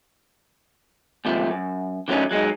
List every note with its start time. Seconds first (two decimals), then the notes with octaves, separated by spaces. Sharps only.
1.25 D#2 G#2 C3 F3 A3
1.50 F#2
2.08 D3 F#3 A3 A#3 C#4 D#4
2.31 F#3 G#3 C4 D#4